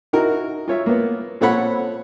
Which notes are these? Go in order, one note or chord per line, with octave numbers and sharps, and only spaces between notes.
D#4 E4 F#4 A#4
F4 C#5 E5
A#3 B3
A#2 C4 A4 C#5 F#5 B5